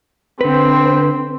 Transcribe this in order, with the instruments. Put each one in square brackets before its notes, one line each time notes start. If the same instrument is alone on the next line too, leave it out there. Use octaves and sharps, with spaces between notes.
[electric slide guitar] D3 B4 [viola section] C4